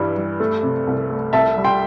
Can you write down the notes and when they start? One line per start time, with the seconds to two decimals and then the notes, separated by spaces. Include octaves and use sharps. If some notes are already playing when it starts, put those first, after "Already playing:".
Already playing: G2 E3 G3
0.16 G3
0.40 A3
0.63 C3
0.87 C2
1.10 A3
1.33 C2 E5 A5
1.57 G3
1.64 G5 C6